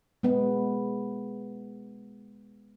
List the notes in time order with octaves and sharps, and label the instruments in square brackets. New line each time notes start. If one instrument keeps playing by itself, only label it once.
[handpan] G#3 B3